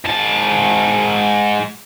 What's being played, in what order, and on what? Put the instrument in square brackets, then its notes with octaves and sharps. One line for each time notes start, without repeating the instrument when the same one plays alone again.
[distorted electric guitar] G#2 A5